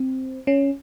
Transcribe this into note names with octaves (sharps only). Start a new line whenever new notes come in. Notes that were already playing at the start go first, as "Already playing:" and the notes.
Already playing: C4
C#4